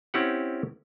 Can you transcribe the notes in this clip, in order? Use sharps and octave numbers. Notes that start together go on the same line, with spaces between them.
C4 C#4 E4 G4 F#5